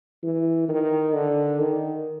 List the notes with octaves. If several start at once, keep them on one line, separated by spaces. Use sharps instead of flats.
E3
D#3
D3
D#3